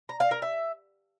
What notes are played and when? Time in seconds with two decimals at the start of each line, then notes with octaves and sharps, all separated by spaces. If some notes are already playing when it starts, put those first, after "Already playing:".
0.09 A#5
0.20 F5
0.31 A#4
0.42 E5